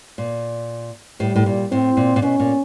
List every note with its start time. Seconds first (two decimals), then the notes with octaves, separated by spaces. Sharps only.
0.18 A#2
1.20 A2 G3
1.36 A2
1.46 A#2
1.72 A2 C4
1.97 A#2
2.16 A#2
2.22 B2 C#4
2.40 A#2